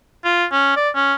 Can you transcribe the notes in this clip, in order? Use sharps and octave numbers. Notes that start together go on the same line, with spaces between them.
F4
C#4
D5
C#4